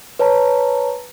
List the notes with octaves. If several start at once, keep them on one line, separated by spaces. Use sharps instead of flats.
B4 C#5 A5 A#5